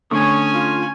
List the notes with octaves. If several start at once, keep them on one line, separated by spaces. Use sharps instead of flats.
D3 A3 C#4 C#5 G#5 C#6 D#6
F4